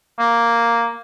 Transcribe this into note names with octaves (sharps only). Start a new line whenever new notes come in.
A#3